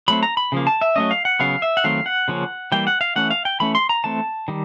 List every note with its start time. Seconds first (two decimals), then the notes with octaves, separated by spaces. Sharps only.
0.08 F#3 A3 C4 B5
0.23 A#5
0.37 B5
0.52 C#3 F3 A#3
0.67 A5
0.81 E5
0.96 F#3 A3 C#4 D#5
1.11 F5
1.25 F#5
1.40 C#3 F#3 B3 F5
1.62 E5
1.77 F#5
1.84 D#3 F#3 A3 C4 F5
2.06 F#5
2.28 C#3 F3 A#3 C#4
2.72 E3 G3 A#3 G5
2.87 F#5
3.01 F5
3.16 E3 A3 C#4 F#5
3.31 F5
3.45 G5
3.60 E3 A3 C#4 B5
3.75 C6
3.89 A#5
4.04 E3 A3 C4 A5
4.48 D#3 G3